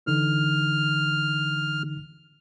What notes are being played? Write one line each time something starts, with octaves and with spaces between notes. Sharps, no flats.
D3 E3 D#4 F6